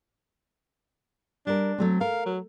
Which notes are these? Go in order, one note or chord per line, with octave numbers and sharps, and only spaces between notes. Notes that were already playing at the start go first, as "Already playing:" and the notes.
G3 D4 A#4
F#3 A3 C4
A#4 F5
F#3